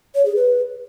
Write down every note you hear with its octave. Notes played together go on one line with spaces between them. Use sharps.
C#5
G#4
B4